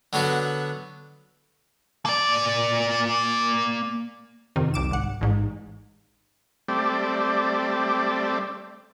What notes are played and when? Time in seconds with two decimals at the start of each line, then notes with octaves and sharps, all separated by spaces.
0.13 D3 F#3 B3 F#4
2.05 A#3 D5
4.56 F2 C3 D#3
4.74 C2 D6 E7
4.91 G#1 F#5
5.21 A1 G#2
6.68 G3 A3 C4 D5